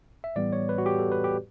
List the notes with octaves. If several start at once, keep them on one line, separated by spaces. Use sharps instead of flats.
E5
A2 E3 G3 B3 D5
C#5
B4
F#4
G4
A4
B4
G4